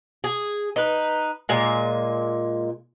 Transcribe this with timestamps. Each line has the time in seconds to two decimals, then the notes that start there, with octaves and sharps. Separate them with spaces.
0.24 G#4
0.76 D#4 B4
1.49 A#2 G#3 G#5